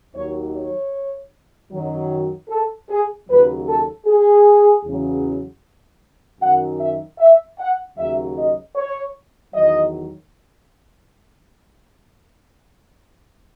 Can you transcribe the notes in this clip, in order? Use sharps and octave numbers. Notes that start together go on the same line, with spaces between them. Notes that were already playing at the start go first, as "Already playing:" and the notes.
D#2 D#3 F#3 C#5
C#5
F#2 D#3 F#3
A4
G#4
D#2 C#3 F#3 B4
A4
G#4
E2 C#3 F#3
F#2 D#3 F#3 F#5
E5
E5
F#5
D#2 C#3 F#3 E5
D#5
C#5
E2 D#3 F#3 D#5